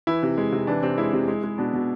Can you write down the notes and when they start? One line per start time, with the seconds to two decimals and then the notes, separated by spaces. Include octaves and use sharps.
0.07 E3 E4
0.23 C3
0.38 G#3
0.52 C3
0.67 E3 D4
0.83 C3 C4
0.98 G#3 E4
1.13 C3
1.28 G#3
1.43 G#3
1.58 B2 D4
1.73 B2